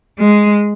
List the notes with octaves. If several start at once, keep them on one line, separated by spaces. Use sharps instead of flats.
G#3